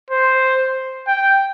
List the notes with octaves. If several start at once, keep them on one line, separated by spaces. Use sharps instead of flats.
C5
G5